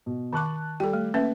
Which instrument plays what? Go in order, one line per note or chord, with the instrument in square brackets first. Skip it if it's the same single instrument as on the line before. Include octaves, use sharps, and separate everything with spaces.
[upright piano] B2
[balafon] D#3 D6 [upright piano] A5 C#6 F#6
[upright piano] G3 [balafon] A4 G5
[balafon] A3
[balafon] A#3 C#4 B4 [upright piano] E5